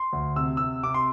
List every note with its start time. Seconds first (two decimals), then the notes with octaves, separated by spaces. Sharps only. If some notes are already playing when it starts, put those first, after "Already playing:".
Already playing: C6
0.13 D2
0.36 C3 E6
0.57 C3 E6
0.83 C3 D6
0.94 C6